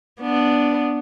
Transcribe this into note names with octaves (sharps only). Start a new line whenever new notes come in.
B3 D4